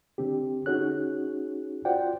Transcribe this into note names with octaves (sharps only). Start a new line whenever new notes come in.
D3 C4 D4 G4
C#4 D#4 F#4 G#4 C#5 F#6
F4 F#4 C5 D5 F#5 G5